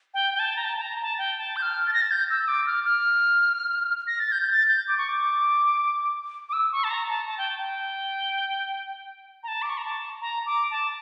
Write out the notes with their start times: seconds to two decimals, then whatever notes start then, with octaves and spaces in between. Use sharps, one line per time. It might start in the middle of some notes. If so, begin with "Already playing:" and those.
0.14 G5
0.35 G5
0.39 A5
0.56 A#5
0.64 A5
0.77 A5
0.82 A#5
1.01 A5
1.18 G5
1.38 A5
1.56 G6
1.62 F6
1.87 A6
1.94 A#6
2.01 A6
2.11 G6
2.30 E6
2.43 E6
2.48 D6
2.67 F6
2.85 F6
4.07 A#6
4.20 A6
4.32 G6
4.42 G6
4.51 A6
4.69 G6
4.88 D6
4.98 C#6
5.09 D6
6.49 D6
6.53 E6
6.72 C#6
6.84 A5
6.90 A#5
7.09 A5
7.27 A5
7.38 G5
7.59 G5
9.43 A#5
9.48 A5
9.62 D6
9.70 C#6
9.78 A#5
9.85 A5
10.21 A#5
10.46 D6
10.71 A5